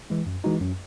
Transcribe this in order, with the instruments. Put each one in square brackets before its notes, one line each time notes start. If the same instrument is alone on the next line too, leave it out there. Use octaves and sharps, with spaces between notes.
[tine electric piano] E3 G#3
F#2
E3 G#3 D#4 F#4
F#2